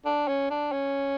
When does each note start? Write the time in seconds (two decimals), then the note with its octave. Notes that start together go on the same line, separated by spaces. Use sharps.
0.05 D4
0.28 C#4
0.51 D4
0.72 C#4